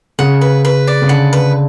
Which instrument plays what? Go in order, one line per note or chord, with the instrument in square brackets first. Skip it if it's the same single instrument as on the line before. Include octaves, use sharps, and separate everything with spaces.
[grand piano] C#3 [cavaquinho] F#5
[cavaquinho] B4
B4
D5
[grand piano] C#3
[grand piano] D3 [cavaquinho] F#5
[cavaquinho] B4